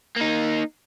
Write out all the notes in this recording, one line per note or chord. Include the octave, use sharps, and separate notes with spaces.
A#3 D#4